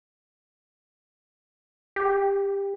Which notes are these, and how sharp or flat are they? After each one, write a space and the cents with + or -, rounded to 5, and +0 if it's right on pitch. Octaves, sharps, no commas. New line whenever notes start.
G4 +20